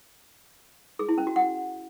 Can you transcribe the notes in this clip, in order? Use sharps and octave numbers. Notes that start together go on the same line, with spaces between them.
G#4
E4
C#4
F#4
F#5